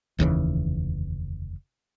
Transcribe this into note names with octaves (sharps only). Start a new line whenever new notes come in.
F1 D#2 C#3 E3